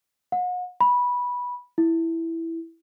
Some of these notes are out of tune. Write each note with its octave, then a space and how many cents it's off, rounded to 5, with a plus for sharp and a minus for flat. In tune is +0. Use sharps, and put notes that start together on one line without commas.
F#5 -40
B5 -10
E4 +0